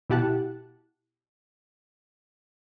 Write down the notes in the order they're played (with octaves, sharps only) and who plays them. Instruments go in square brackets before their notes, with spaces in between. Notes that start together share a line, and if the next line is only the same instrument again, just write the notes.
[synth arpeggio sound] B2 E4 G4 F#5 A5 F#6